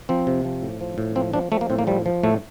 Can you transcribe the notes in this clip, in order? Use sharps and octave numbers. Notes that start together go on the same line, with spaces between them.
F3 C4
C3
F3
A2
F3
A2
F3 C4
F3 D4
F3 A3
A#3
A2 C4
A#3
F3 G3
F3
A2 A3